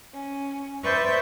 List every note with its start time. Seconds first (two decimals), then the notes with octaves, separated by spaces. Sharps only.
0.14 C#4
0.84 B4 C5 D5 E5 C#6 G6